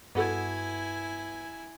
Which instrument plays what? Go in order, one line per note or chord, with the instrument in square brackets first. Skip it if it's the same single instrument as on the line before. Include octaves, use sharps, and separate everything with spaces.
[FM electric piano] G2 [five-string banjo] B3 F#4 A4 [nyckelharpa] E4 G#5